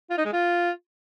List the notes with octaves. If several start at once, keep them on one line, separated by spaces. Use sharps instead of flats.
F4
D#4
G#3
F4